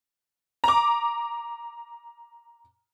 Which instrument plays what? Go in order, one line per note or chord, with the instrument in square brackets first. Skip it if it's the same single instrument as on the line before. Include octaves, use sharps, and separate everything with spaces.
[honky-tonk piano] A#5 D6